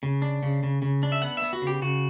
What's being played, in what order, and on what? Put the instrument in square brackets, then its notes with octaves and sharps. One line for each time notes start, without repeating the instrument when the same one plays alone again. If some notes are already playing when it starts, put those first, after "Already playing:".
[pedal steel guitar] C#3
D4
C#3
C#3
C#3
D4
E5
B3 F#5
B3 E5
F#4
C#3 G4
C#3 F#4